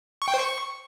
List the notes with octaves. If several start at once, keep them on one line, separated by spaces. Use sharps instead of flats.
C#6
G5
C5
C#6